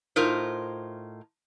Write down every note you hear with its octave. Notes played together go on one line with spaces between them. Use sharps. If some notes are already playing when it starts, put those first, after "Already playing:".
A2 D#4 F4 A#4 C5